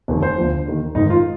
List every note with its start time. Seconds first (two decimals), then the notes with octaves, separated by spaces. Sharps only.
0.08 F1 F2 D#3
0.23 C5
0.37 D2 D3 F3
0.66 D#2 D#3
0.95 G#1 G#2 D#3 D#4
1.10 F4